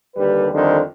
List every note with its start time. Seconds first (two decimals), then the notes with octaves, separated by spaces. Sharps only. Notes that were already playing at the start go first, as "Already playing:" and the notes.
0.16 D#2 D3 G3 B4
0.52 F2 D3 D#3 G3 D4 C5